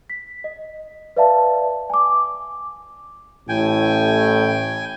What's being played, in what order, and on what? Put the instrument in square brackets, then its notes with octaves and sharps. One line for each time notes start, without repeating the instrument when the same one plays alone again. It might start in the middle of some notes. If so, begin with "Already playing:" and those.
[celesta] B6
D#5
B4 D5 E5 F5 A5
G#5 D6
[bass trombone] A1 [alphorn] A2 [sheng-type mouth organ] G5 G#5